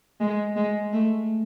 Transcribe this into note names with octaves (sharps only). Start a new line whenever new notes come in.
G#3
G#3
A3